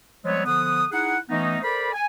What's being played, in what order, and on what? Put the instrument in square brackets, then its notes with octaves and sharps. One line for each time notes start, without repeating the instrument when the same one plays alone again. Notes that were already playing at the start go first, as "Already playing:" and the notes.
[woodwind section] F3 G3 G#3 B3 C4 C#5
D3 F3 B3 F#5 D#6
D#4 E4 G#4 F#5
E3 A3 B3 C#4 D#4
A4 A#4 C5 D5 B5
G#5